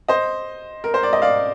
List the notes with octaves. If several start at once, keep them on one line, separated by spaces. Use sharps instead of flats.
C5 D#5
A#4
C5
D5
D#5
D5 F5